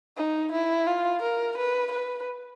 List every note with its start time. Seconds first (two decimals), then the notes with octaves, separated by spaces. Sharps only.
0.17 D#4
0.52 E4
0.87 F4
1.22 A#4
1.57 B4
1.92 B4